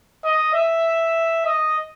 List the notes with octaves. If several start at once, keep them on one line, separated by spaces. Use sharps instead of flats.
D#5
E5
D#5